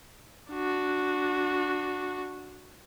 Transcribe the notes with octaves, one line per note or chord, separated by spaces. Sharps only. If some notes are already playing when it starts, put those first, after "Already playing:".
D4 F#4